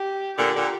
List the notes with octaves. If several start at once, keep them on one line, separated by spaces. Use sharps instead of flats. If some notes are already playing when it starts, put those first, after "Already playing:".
Already playing: G4
A#2 D3 G4
A#2 D3